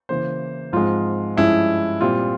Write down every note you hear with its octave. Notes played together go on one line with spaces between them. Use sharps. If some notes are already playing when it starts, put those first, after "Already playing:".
C#3 E3 A#3 C5
G#2 F3 G#3 C4 F4
G2 F3 G#3 C#4 E4
A#2 G3 C4 F4